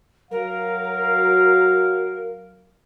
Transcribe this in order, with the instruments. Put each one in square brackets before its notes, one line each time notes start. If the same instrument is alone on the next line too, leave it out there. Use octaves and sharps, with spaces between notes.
[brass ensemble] F#3 F5 [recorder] A#4